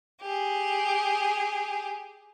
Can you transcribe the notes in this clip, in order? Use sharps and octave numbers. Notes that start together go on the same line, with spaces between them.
G4 G#4